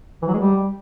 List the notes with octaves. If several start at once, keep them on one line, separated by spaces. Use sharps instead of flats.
E3
F#3
G#3
G3